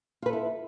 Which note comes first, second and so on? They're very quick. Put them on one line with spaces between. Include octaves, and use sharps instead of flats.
F4 B4 A4 E4